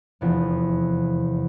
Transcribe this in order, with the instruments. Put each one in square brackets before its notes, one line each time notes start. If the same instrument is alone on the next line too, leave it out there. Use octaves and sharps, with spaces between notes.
[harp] F1 E2 C3 F3